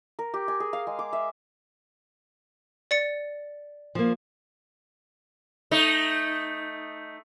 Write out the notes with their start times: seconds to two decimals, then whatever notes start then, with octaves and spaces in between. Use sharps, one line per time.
0.19 A#4
0.34 G4
0.48 G#5
0.60 G#4
0.73 F5
0.87 G#3
0.99 D6
1.13 E5
2.91 D5 A6 C#7
3.95 F3 A#3
5.71 A3 D#4